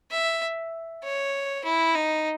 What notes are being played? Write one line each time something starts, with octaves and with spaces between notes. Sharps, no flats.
E5
C#5
E4
D#4